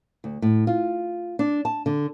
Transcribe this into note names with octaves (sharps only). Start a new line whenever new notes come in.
D2
A2
F4
D4
A5
D3